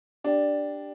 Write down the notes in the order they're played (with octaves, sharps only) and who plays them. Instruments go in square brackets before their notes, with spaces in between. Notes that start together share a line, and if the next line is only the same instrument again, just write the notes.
[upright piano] D4 [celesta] G4 D5 G5